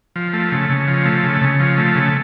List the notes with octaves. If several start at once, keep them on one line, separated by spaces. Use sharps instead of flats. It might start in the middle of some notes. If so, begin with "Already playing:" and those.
F3
A3
C#3
C#3
F3
A3
C#3
C#3
F3
A3
C#3